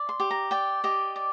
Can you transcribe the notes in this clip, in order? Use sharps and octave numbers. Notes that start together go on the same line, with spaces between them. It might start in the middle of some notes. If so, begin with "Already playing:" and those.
Already playing: D5
C6
G4
A#5
D5 G5
G4 D#5
D5